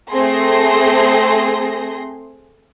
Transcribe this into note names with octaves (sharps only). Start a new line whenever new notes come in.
A3 C4 G#4 C6 A#6